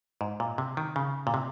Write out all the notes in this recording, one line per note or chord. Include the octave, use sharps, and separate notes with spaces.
G#2
A#2
C3
D#3
C#3
A#2
C3